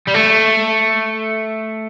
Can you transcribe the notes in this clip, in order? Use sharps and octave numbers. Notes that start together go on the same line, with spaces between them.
G3
A3